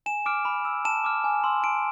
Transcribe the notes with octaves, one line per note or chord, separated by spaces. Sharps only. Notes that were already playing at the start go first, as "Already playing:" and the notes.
G#5 E7
D6 F6 D7
B5
E6
A5 E7
D6 F6
G#5
C6 E6
A5 D7